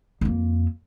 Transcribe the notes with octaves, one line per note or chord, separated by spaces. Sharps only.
F2 A#3